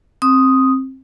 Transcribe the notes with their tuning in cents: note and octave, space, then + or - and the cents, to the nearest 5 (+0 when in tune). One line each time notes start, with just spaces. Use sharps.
C4 +20 D#6 +0